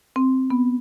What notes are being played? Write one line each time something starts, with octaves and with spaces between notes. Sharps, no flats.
C4
B3